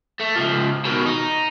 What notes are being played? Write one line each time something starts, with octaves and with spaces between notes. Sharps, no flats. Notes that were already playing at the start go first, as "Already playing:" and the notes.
A3
C#2 F3
B2 D#3
D#4